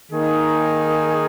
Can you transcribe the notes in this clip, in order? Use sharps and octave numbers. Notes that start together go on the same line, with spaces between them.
D#3 A#3 D#4 G#4